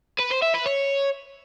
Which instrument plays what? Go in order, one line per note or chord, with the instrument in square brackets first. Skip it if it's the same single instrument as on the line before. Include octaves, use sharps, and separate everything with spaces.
[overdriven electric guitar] B4
C5
E5
B4
C#5